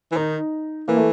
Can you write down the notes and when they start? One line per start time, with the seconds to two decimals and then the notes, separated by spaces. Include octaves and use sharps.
0.11 E3
0.16 D#3 D#4
0.88 E3 A#3
0.97 A3